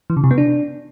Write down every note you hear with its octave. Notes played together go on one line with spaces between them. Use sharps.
E3
C#3
C3
B3
D4